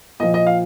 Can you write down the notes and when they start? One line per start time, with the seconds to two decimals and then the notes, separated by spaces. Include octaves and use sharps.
0.20 A#2 F3 D#5
0.34 D#5
0.47 F5